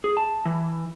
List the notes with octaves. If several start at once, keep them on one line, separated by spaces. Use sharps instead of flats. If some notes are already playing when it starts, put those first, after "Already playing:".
G#4
A5
E3